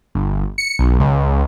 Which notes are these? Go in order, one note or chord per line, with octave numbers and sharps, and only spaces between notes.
G1
C#7
B1
C#2